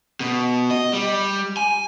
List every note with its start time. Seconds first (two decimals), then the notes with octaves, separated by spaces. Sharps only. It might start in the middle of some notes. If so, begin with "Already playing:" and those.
0.20 B2
0.71 D#5
0.93 G3
1.57 G#5